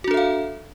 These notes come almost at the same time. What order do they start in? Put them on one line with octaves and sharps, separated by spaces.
F#4 D4 A4 E5 F5